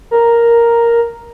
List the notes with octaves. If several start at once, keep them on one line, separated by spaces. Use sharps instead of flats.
A#4